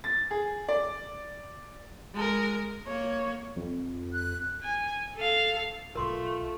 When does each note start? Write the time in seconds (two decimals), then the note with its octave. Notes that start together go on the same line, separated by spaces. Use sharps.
0.04 A6
0.31 G#4
0.68 D5
2.14 G#3 A#4
2.87 A#3 C#5
3.56 F2
4.12 F#6
4.63 G#5
5.16 A4 F5
5.95 B1 A3 F4 A#4 C6 D6